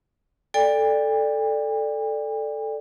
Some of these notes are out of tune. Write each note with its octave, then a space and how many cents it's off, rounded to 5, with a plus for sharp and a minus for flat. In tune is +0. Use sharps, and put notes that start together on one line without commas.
A4 +0 D5 +5 G5 +40